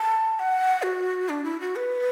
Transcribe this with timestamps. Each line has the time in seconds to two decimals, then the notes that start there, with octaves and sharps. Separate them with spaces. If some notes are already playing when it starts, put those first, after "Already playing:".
Already playing: A5
0.36 A5
0.39 F#5
0.83 F#4
1.29 D4
1.44 E4
1.60 F#4
1.76 B4